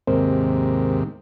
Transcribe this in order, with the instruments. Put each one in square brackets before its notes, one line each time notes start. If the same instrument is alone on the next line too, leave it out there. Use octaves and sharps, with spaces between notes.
[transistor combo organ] D#2 G#2 C3 [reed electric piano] C4 A#4 C5